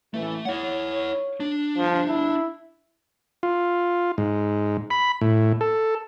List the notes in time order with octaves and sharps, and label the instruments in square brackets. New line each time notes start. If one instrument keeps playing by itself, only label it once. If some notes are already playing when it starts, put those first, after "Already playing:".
[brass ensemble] A1 E3 [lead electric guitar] A3
[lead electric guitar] E4 F#5 [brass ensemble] C#5
[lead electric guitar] D4
[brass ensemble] G1 G#2 [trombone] F3
[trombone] E4
[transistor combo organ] F4
G#2
B5
A2
A4